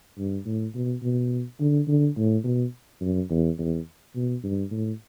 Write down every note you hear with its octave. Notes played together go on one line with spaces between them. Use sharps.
G2
A2
B2
B2
D3
D3
A2
B2
F#2
E2
E2
B2
G2
A2